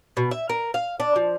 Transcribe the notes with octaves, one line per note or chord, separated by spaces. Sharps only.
B2
E5
A#4
F5
D4
F3